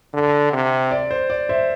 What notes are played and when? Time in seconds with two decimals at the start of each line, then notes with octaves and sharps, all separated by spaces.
0.14 D3
0.53 C3
0.91 D5
1.11 C5
1.30 D5
1.49 C5 E5